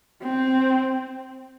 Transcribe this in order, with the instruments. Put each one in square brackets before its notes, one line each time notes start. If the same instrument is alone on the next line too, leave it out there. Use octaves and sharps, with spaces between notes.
[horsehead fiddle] C4